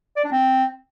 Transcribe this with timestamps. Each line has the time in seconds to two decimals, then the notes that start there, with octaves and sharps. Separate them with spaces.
0.17 D5
0.24 D4
0.32 C4